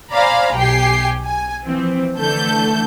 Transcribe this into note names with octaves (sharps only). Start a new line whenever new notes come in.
C5 D5 F5 G#5 A#5 B5
B1 G4 G5 G#5 C7
G#5
E3 F3 C4
D3 E3 A3 A4 G6